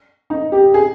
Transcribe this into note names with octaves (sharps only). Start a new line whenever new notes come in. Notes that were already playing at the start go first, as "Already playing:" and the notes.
D#4
G4
G#4